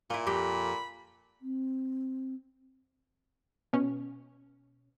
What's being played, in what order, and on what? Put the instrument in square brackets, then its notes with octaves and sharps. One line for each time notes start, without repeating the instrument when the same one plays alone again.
[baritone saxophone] A#2 [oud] E4 F4
[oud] F2 G4 [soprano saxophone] B5
[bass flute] C4
[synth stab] B2 C#4